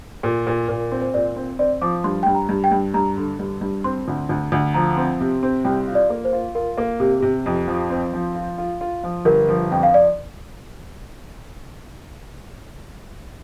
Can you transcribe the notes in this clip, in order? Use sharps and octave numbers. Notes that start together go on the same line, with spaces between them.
A#2
A#2
A#2 A#4
C4
C5
A#2 D5
C4 C5
C4 D5
F3 D6
G2 C6
G2 G5
A#5
G2
G5
G2
G2 A#5
D3
G2
G2
C4 C6
D2
D2
D2
F3 A#5
C4
C3
C4
C2 G5
F4
D5
A#3
C5
F4
F4 A#4
A#3
C3 G4
C3 G4
F2
F3
C4
F3
F4
F4
F4
F3
G1 A#4
F3
F2 G5
F5
D5